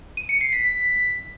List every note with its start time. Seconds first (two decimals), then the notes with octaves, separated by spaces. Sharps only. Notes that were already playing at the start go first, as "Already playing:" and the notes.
0.17 D#7
0.29 C#7
0.41 C7
0.53 B6